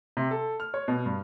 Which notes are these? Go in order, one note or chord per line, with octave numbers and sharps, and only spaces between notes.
C3
A4
F6
C#5
B2
G2